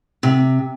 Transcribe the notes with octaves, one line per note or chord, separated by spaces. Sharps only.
C3